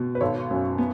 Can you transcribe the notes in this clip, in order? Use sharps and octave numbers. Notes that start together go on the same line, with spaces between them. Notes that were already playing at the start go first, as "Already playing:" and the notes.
Already playing: B2
B4
G#1 A4 C#5
F#2
B3